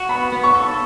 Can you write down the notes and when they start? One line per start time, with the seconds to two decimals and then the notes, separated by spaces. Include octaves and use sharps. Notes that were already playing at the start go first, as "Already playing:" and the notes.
Already playing: F#4
0.09 B3 B5
0.32 B3
0.43 C#6
0.55 A4